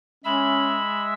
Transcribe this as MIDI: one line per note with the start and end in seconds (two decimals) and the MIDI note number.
0.24 1.14 56
0.24 0.79 61
0.24 1.14 76
0.24 1.03 83
0.24 1.14 88